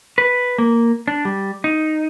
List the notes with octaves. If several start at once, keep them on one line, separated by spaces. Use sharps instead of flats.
B4
A#3
D4
G3
D#4